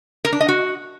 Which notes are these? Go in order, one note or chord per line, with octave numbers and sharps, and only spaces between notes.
A#4
D4
D#5
F#4